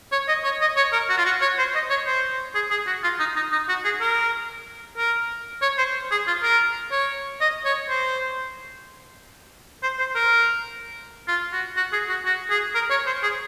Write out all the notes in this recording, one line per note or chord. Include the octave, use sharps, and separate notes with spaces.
C#5
D#5
C#5
D#5
C#5
A#4
F#4
F4
F#4
C#5
C5
D#5
C#5
C5
G#4
G#4
F#4
F4
D#4
D#4
D#4
F#4
G#4
A#4
A#4
C#5
C5
G#4
F4
A#4
C#5
D#5
C#5
C5
C5
C5
A#4
F4
F#4
F#4
G#4
F#4
F#4
G#4
A#4
C#5
C5
G#4